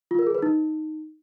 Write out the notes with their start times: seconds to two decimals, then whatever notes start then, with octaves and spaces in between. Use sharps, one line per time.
0.11 F4
0.19 A#4
0.27 G#4
0.35 B4
0.42 D#4